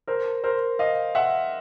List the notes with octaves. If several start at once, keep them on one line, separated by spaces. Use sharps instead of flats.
A#4 C5
A#4 C5
D#5 F5
E5 F#5